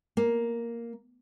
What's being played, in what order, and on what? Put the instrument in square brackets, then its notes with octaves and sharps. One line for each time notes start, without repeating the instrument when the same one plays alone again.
[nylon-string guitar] A#3